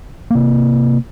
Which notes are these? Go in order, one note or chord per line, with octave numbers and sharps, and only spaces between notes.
C3 A#3